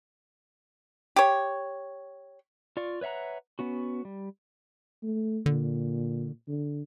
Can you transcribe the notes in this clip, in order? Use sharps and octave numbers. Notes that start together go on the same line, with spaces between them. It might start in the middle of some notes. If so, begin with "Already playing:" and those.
G4 C#5
F4 D5 C#6
B4 C#5 E5 F#5 A#5
B3 C#4 F#4
G3
A3
A#2 D3
D3